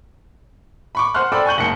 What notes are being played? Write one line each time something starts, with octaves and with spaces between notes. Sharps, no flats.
B5 C#6 D6
C5 F#5 C6 F6 F#6
A4 C5 D5 G5 B5 E6
G#5 C#6 G6 F#7
F#1 G#2 C#7 G7